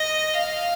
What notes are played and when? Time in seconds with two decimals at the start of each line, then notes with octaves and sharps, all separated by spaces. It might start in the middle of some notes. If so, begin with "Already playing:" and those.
Already playing: D#5
0.34 F5